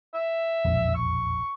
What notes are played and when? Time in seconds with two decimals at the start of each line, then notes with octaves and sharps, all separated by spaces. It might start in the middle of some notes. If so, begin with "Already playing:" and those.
0.14 E5
0.65 E1 A#1 F2
0.95 C#6